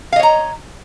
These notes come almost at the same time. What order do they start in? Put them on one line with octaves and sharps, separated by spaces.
F5 D#5 C#5 A#5